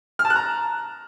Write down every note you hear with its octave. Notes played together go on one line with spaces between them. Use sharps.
F6
A5
F#6
A#5